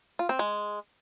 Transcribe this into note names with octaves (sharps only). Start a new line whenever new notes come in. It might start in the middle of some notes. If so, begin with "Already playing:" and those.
F4
C4
G#3